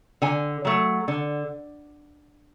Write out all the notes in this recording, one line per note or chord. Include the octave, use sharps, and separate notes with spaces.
D3 G#5
F#3 A3
D3